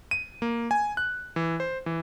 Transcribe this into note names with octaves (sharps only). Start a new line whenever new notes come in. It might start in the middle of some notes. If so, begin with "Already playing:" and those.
D#7
A#3
G#5
F#6
E3
C5
E3